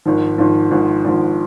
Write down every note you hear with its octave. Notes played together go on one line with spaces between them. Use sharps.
G#1 G#2 F3
G#1 G#2 F3
G#1 G#2 F3
G#1 G#2 F3